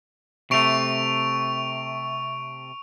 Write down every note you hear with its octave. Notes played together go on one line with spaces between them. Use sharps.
C3 A3 C#6 D7 F7